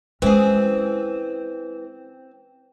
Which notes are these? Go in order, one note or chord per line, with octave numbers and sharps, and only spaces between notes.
E3 G#3 C4 C#4 G#4